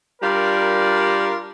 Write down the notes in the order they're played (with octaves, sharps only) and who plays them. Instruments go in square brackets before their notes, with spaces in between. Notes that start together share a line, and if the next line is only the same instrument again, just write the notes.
[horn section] G3 D4 F4 A#4